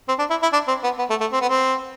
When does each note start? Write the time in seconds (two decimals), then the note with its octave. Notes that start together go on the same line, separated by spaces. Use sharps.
0.08 C4
0.19 D4
0.30 E4
0.43 E4
0.53 D4
0.68 C4
0.84 B3
0.99 B3
1.10 A3
1.21 A3
1.32 C4
1.41 B3
1.49 C4